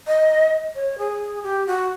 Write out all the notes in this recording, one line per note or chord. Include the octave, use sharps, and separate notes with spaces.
D#5
C#5
G#4
G4
F#4